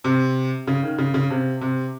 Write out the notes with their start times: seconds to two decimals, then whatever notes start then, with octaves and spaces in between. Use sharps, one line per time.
0.04 C3
0.67 C#3
0.83 D#3
0.98 C#3
1.14 C#3
1.30 C3
1.61 C3